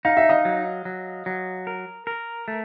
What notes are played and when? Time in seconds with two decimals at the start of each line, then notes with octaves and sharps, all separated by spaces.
0.05 D#4 F5
0.17 E5
0.29 D#5 F5
0.45 F#3
0.85 F#3
1.26 F#3
1.67 A#4
2.07 A#4
2.48 A3